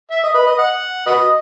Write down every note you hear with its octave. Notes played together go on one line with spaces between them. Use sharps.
E5
D#5
B4
D#5
F#5
F#4 B4 D#5